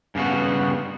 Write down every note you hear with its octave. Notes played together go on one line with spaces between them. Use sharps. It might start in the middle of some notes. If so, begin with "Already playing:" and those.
G2 C#3 B3 F#4